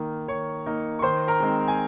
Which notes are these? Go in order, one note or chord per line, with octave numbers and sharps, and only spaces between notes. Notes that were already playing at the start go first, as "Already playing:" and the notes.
Already playing: D#3 A#3 D#4
D#3 C#5 C#6
A#3 D#4
C#6
D#3 C5 C6
A#4 A#5
G#3 C4 D#4
G#5